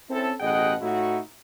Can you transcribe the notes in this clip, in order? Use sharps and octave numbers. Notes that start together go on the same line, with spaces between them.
C4 C#4 E4 A4
A1 B2 G#4 D#5 F#5 G5
A2 D#4 E4 F#4